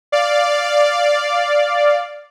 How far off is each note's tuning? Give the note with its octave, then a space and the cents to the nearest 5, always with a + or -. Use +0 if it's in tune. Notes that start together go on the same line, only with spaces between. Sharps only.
D5 +0 F5 +0